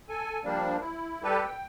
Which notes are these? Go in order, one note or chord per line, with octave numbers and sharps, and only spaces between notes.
A4 G#5
F3 G3 A#3 D4
E4
G3 G4 A4 B4
G5